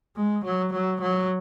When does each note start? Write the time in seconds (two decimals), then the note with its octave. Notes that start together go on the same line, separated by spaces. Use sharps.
0.16 G#3
0.44 F#3
0.73 F#3
1.01 F#3